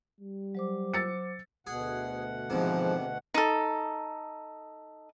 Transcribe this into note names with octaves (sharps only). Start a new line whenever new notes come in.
G3
F#3 C5 D6
E6 A6 C#7
D2 B2 G#4 F#5
E2 G#2 C3 F3
D#4 A4